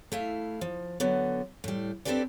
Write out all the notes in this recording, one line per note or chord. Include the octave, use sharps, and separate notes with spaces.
A3 E4 F5
F3
D3 F#3 B3
A2 G3
C4 D4 G4 A4 B4 D5